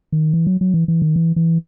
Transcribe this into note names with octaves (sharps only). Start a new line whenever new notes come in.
D#3
E3
F#3
F#3
E3
E3
D#3
E3
E3